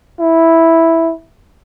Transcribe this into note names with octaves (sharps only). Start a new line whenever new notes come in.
E4